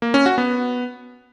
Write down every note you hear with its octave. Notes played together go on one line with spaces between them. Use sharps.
A#3
C#4
F#4
B3